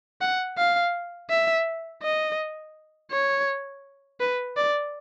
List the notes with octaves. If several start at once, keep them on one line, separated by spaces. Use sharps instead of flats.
F#5
F5
E5
D#5
C#5
B4
D5